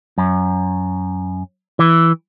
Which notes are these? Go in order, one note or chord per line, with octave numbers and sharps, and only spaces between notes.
F#2
E3